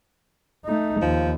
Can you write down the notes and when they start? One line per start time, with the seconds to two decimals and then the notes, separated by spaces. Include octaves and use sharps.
0.65 A3 D#4
1.02 D#2 F3